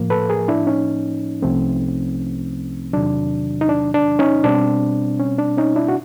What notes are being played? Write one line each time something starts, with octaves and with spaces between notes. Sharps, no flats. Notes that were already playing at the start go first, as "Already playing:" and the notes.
Already playing: A2 F3 A#3
A4 B4
G#4 A#4
D4 E4
C#4 D#4
C2 C3 F3 A3 C4
E2 C3 D#3 F#3 D4
D#4
D4
D4
C#4 D#4
B2 G3 C4 D4
C#4
D4
C#4 D#4
D4 E4
F#4